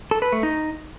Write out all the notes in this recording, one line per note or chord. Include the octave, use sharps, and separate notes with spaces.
A4
B4
A3
D#4